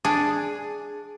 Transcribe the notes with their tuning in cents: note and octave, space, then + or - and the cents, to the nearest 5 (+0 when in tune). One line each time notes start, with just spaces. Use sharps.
D4 +0 G#4 +0